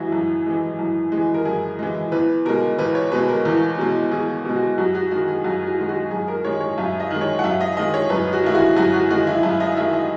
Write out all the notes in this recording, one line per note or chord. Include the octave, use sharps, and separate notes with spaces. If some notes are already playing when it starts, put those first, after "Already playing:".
Already playing: F#2 E3 G#3 E4 F#4
F#2
E3 G#3
F#2
E3 G#3
A#4
F#2 G#4
E3 G#3
E2 B4
B2 G#3 A#4
E2 B4
C#5
B2 G#3 B4
A#4
E2
B2 G#3
E2 G#4
B2 G#3
F#4
F#2 F#4
F#4
D#3 G#3 F#4
G#4
F#2 F#4
F#4
D#3 G#3
F#4
F#2 G#4
A#4
D#3 G#3 C#5
C#5
F#2 E5
D#5
D#3 G#3
C#5
F#5
F#2 E5
D#5
D#3 G#3 D#5
C#5
F#2 B4
F#4
D#3 G#3 E4
F#4
F#2 F#4
F#4
D#3 G#3 F#4
E4
F#2 E4
D#5
D#3 G#3 E5
D#5